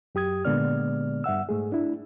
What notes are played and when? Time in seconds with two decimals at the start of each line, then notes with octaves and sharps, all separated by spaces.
0.15 F#2 G4 D#6 G#6
0.45 A#2 D3 G#3 B3 D5 F6
1.24 G2 E5 F#5 E6
1.49 G#2 A3 G#4
1.72 D4 E4